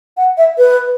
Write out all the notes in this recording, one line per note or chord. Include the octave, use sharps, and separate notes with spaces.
F#5
E5
B4